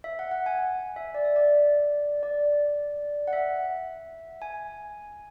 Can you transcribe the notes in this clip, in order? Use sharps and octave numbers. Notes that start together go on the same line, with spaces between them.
E5
F#5
F#5
G#5
E5
D5
E5
D5
D5
F#5
E5
G#5